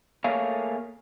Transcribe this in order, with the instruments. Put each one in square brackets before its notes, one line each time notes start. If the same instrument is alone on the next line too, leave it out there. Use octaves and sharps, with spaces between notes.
[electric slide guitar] A3 A#3 G#4 C#5 F5